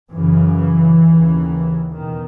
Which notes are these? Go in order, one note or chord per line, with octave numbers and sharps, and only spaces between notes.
F#2 C#3 E3
D#2 C#3
E2 B2 D#3